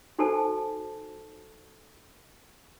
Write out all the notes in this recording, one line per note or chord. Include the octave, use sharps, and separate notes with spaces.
D#4 F#4 A4 C5 G#5 A5